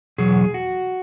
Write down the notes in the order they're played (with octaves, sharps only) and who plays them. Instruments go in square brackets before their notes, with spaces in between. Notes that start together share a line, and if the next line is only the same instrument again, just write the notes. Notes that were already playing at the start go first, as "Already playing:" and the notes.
[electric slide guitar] E2 B2 F#3 G#4
F#4